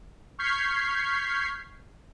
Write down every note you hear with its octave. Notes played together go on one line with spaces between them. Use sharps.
C#6 F6 G6 G#6 B6 C7